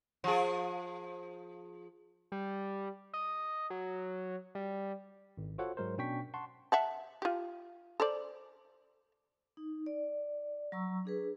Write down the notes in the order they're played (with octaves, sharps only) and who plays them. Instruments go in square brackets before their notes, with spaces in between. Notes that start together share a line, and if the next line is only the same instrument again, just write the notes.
[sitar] F3 G#4
[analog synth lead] G3
D#5
F#3
G3
[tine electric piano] G#1
F4 F#4 A4 C5 C#5 F#5
G#2 F#3 G#3 A#4 C5
B2 C#4 D4 G5 C#6 B6
F#5 A5 C6 C#6
[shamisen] E5 F#5 A5
F4 G4
A4 C5 D5
[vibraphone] D#4
D5
F#3 A#5 C#6 E6
D4 G#4 B4